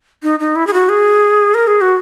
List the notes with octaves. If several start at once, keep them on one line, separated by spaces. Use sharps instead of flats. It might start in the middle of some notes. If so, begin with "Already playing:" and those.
D#4
D#4
E4
G#4
F#4
G#4
A#4
G#4
F#4